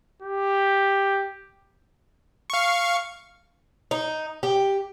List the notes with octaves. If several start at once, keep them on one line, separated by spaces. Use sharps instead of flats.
G4
F5 C#6
D#4
G4